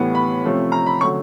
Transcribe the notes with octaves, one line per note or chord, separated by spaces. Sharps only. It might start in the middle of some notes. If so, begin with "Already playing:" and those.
Already playing: A2 E3 G3 B3
B5
C3 F3 A3 C#4
A#5
B5
D3 F#3 A3 C#4 C#6